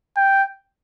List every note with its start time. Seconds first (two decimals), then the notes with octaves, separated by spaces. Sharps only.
0.17 G5